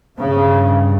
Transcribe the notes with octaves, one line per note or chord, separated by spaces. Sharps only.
G2 C#3